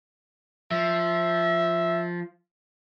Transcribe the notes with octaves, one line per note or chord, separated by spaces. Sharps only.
F3 E5